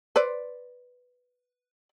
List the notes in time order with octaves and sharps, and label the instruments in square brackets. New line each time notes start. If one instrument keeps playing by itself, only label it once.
[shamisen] B4 C5 D5